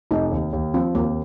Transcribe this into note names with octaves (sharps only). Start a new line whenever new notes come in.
F1 D#4
D#2
D#2
F3 C4
D#2 A#3